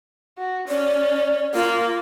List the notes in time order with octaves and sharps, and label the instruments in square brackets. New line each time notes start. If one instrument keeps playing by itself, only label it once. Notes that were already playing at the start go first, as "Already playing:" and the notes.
[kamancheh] F#4
[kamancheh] C#4 [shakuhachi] D5
[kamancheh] A#3 [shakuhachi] F4